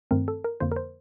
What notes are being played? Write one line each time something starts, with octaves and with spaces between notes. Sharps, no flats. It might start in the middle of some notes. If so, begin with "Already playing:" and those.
G2 D#3 A3 C4 A#4
A4
A#4
F2 D3 F3 A#3 C5
A#4
C5